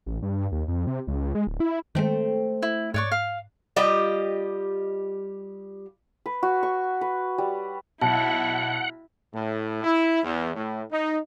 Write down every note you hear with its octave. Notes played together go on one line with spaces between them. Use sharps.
A1
G2
D#2
F2
C3
C#2
G#3
D1
E4
D#3 G#3 A3 C4
E4
G#2 C#5 D5 C#6 F#6
F5
G3 F4 G4 D#5
B4
F#4
C#6
B4
G3
B1 E4 F#5 A5
A2
E4
E2
A2
D#4